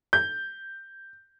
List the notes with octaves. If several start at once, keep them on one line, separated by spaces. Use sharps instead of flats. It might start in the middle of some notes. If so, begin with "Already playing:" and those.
G6